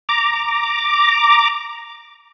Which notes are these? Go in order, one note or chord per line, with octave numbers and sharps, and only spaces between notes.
A#5 D6